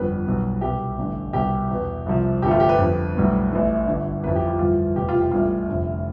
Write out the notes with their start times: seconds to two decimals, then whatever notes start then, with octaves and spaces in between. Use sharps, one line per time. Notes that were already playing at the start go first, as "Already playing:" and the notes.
Already playing: G1 F2 D3 G3 B3 B4
0.25 B1 B2 G3 B3
0.61 C2 B2 B3 G4
0.98 A1 G2 D3
1.33 C2 B2 B3 G4
1.71 E2 B2 B3
2.06 C2 C3 F3
2.42 G1 G2 F3 A3 G4
2.51 F4
2.60 G4
2.69 B4
2.78 F2 D3 F3 B3
3.15 B1 A2 G3 B3
3.52 A1 A2 E3
3.87 G1 G2 D3
4.23 F2 E3 B3 B4
4.35 G4
4.47 F4
4.59 G1 F2 E3 B3 F4
4.96 F1 E2 B2 G4
5.09 F4
5.20 G4
5.32 A1 A2 G3 B3 F4
5.69 F1 F2 D3